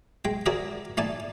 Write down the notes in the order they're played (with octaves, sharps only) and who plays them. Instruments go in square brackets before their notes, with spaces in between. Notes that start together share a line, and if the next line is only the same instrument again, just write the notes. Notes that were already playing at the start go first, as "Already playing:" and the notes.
[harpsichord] G#3 G5
F#4 G#4 A#4 D5 E5
A3 D#4 D5 G#5 A5